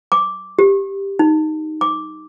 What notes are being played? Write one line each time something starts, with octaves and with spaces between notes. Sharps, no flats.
D6
G4
D#4
D6